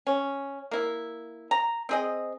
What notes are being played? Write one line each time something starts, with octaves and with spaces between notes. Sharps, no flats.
C#4
A#3 E4
A#5
C4 G#4 D#5